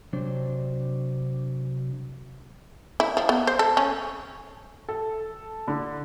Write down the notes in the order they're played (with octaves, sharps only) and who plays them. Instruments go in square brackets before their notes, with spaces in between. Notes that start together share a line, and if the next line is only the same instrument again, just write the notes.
[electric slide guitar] C3 F#3 D4 C5
[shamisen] E4
F3
B3
C5
A4
C#4
[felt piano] A4
D3